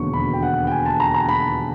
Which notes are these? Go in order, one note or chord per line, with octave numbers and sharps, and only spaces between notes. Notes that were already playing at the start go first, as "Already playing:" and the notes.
Already playing: E1 D#2 D3 F#3 C#6
B5
G5
F#5
G5
G#5
A5
A#5
A#5
B5